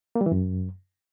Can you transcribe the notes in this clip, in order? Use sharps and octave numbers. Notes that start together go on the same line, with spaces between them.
A#3
G3
E3
F#2